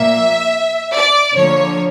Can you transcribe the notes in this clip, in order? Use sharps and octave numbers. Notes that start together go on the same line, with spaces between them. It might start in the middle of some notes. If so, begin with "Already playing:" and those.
Already playing: A#2 F3 A#3 E5
D5
D3 F3 A#3 C#5